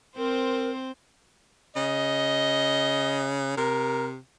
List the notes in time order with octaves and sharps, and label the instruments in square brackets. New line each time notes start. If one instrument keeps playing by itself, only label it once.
[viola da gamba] C4 C5 [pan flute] A#4
[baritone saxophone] C#3 [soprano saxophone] D#5
[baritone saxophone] C3 [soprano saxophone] A#4